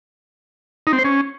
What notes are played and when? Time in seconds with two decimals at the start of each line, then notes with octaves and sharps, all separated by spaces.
0.87 D#4
0.93 C4
0.99 C5
1.04 C#4